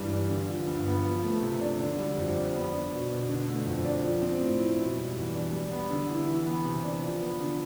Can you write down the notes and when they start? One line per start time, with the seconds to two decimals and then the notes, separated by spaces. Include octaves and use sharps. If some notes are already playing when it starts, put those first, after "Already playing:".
Already playing: G2 E3 G3
0.12 D4
0.30 D3
0.49 F3
0.67 G2
0.86 B3
1.05 F3
1.23 A3
1.42 C3
1.61 D4
1.80 D3
1.98 G3
2.17 F2
2.35 D4
2.54 B3
2.73 D4
2.92 B2
3.10 B2
3.29 D3
3.48 A3
3.66 F2
3.85 D4
4.04 F3
4.22 C4
4.41 A2
4.60 E4
4.78 B2
4.97 G3
5.16 E2
5.34 D4
5.52 G3
5.72 B3
5.91 D3
6.09 E4
6.28 E3
6.46 B3
6.65 C3
6.84 D4
7.03 F3
7.21 B3
7.40 D3